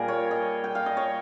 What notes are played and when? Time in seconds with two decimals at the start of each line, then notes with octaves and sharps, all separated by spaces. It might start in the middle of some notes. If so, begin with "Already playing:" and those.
Already playing: A#2 G3 G#4 A#4
0.08 C#5
0.31 D#5
0.64 G5
0.75 F5
0.86 D#5
0.97 C#5